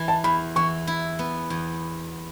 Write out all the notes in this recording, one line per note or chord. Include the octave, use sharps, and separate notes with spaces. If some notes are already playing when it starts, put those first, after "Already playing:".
Already playing: E3
A5
E2 B5
E3 C#6
E4
B3
E2